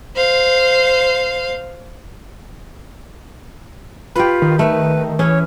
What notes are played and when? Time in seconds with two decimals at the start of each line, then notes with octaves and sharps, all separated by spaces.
0.15 C5 F5
4.16 F4 G4 B4
4.42 D#3
4.59 A3 B4
5.19 E3 C#4 G#4 C#5